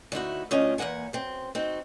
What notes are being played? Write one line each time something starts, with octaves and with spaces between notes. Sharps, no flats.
D2 D#4 E4 F#4
D2 A3 C#4 D4 F4 D#5
E2 D#3 A#3 F#5 G#5
F#2 C4
C4 D#4 F#4